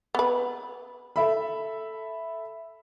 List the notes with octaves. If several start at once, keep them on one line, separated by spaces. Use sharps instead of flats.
B3 B4
A4 E5 B5